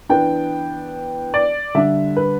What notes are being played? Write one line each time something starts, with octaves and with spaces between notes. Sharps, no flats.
E3 B3 D4 G5
D5
D3 G3 D4 E5
B4